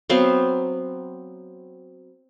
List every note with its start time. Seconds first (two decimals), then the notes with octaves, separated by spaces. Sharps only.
0.09 F#3 B3 C4 F5